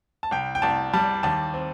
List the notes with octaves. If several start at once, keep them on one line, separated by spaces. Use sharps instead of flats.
A5
C2 G5
G5
C2 A5
G3 A5
D#2 A5
C4